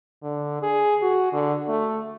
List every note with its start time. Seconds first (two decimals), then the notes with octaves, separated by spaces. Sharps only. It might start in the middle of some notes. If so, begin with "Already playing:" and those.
0.23 D3
0.62 G#4
1.02 F#4
1.33 D3
1.69 A3